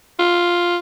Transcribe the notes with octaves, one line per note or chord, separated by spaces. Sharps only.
F4